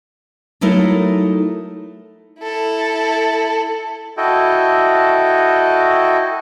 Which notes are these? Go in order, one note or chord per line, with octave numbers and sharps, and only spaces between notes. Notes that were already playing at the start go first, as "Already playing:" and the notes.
F#3 A3 D#4 E4 A4 A#4
E4 A4
E4 F#4 A4 D#5 G5